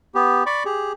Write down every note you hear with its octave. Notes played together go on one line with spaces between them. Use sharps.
B3 G4
D5 B5 C#6 D6
G4 G#4